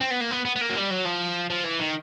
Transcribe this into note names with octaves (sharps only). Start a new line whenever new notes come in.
C4
B3
A#3
B3
B3
B3
A#3
F#3
G3
F#3
F3
F3
E3
D#3